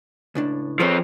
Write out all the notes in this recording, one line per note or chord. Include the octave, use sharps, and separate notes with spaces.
C#2 A2 D4
F3 C4 G#4 B4 C#5